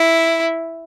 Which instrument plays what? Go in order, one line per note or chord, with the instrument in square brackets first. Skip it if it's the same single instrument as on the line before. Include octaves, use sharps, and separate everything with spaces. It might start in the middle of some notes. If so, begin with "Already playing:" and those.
Already playing: [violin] E4